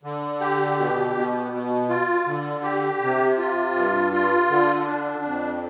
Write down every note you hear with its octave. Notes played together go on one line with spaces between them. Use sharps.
D3
G4
B2
B2
B2
F4
D3
G4
C3
F4
G2
F4
D3
D4
F2